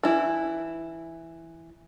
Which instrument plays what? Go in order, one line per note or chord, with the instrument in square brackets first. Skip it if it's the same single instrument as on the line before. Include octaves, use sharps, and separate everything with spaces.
[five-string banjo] E3 E4